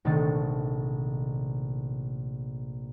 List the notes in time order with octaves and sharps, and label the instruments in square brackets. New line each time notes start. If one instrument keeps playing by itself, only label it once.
[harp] A#1 C3 D#3 A3 D#4 A5